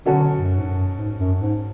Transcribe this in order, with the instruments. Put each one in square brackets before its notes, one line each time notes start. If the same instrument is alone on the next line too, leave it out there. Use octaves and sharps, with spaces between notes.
[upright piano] B2 F#3 C#4 F#4 A4 [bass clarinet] D3
[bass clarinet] F#2
G#2
F#2
G#2
F#2
G#2